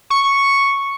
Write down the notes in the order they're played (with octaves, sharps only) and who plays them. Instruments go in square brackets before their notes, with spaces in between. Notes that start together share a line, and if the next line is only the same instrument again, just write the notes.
[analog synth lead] C#6